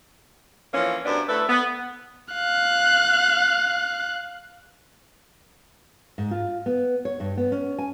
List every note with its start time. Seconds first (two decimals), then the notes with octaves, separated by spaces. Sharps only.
0.74 E3 F3 A#3 C#4
1.05 F#2 C3 B3 D4
1.28 A3 E4 A4 B4
1.49 B3
2.34 F5 F#6
6.18 G#2
6.31 F4
6.66 B3
7.05 C#5
7.20 G2
7.37 B3
7.52 C#4
7.78 G#5